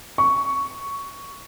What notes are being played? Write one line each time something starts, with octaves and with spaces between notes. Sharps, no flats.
C#6